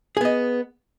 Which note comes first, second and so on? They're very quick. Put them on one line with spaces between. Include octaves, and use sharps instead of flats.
G#4 B3 D#5